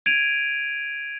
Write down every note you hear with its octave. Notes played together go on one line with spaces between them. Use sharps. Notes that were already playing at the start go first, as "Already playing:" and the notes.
G#6 D7 D#7 F7